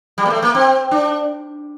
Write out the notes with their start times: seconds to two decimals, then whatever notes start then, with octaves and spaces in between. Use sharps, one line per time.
0.18 G3
0.25 A#3
0.30 A3
0.42 A#3
0.55 C4
0.91 D4